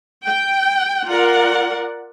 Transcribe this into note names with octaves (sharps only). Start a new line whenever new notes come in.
G5
F4 A#4 D5 F#5